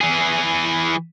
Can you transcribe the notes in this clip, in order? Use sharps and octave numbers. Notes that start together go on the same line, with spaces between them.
E3 G#4